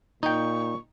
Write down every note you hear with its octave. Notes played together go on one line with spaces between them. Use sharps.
A#2 D#4 G5 C#6